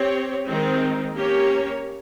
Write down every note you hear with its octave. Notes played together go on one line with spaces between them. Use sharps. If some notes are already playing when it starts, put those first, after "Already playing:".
Already playing: C4 G4 C#5
D#3 G#3 C4 D#4
A#3 C#4 G4 C#5